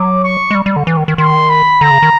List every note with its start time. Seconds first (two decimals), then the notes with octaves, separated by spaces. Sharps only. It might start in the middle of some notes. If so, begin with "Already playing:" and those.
Already playing: F#3 D6
0.24 C#6
0.51 G#3
0.55 G3
0.66 G3
0.76 D3
0.87 E3
0.97 D#3
1.08 D#3
1.18 D#3 C6
1.49 B5
1.81 D3 A#5
1.91 C#3
2.03 D#3